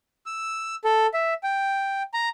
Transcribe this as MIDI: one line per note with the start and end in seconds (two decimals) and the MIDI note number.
0.26 0.75 88
0.84 1.07 69
1.14 1.34 76
1.43 2.03 79
2.14 2.29 82